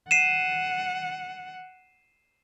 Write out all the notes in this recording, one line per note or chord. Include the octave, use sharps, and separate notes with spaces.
F#5 C7 D#7 E7